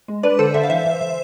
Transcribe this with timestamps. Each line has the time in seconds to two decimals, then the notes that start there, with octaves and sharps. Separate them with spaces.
0.08 G#3
0.23 D4 B4 D5
0.39 D3 A4 C5
0.54 D3 C5 E5
0.63 F5
0.70 E3 C5 E5
0.85 E3
1.01 E3